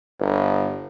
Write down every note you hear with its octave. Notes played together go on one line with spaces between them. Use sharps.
G1